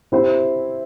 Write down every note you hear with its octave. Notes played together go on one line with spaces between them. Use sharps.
C4 E4 G4 C5 E5